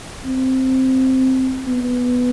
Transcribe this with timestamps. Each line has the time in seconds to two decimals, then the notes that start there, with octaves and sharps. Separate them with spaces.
0.25 C4
1.66 B3